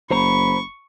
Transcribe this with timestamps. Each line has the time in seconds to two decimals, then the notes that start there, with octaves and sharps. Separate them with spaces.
0.11 F#1 C5 A#5 B5 C#6